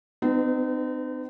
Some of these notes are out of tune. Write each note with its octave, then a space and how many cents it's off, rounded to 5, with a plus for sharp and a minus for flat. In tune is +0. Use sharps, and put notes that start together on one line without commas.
C4 -45 D#4 -35 B4 +20